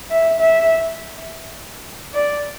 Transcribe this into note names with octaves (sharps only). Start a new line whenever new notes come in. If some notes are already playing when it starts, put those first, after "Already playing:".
E5
E5
D5